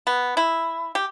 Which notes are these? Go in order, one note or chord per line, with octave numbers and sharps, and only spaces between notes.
B3
E4
G4